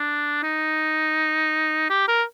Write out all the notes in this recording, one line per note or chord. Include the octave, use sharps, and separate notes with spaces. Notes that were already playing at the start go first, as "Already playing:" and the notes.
Already playing: D4
D#4
G4
A#4